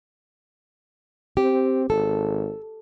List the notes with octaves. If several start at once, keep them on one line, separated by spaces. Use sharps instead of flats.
C4 G4
G#1 A4